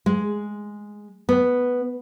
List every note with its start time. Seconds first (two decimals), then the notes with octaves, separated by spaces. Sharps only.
0.06 G#3
1.29 B3